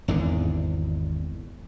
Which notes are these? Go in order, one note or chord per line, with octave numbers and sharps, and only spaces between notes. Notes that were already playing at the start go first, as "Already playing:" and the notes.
G#1 E2 D3